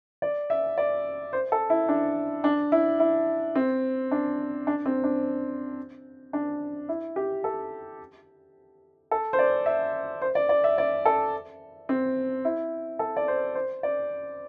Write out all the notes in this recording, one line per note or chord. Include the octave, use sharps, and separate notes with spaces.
D5
E5
D5
C5
A4
E4
D4
D4
E4
E4
C4
D4
D4
C4
D4
D4
E4
G4
A4
A4
C5
D5
E5
C5
D5
D5
E5
D5
A4
C4
E4
A4
D5
C5
C5
D5